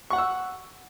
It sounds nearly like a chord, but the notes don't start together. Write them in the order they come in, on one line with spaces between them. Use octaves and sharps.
C#6 F#5 F#6 E6